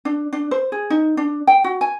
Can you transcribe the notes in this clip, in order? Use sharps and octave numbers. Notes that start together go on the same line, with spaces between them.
D4
D4
C5
G#4
D#4
D4
G5
F#4
G#5